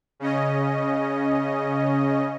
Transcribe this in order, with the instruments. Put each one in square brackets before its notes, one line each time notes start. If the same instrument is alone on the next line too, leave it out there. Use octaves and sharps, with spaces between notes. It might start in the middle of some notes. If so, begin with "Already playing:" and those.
[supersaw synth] C#3 C#4 D#5